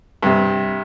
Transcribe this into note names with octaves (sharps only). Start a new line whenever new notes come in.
G2 C3